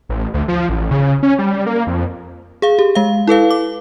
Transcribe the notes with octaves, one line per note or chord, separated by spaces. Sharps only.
A1
D2
F3
A1
C#3
C#4
G3
A#3
F2
G#4 F5
G4
G#3 F5
E4 A4 B4 F5
D6